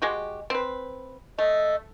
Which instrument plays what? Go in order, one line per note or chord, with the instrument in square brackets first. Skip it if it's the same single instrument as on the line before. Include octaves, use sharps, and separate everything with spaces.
[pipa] G#3 F#4 G4
C4 B4
[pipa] A3 [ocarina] D#5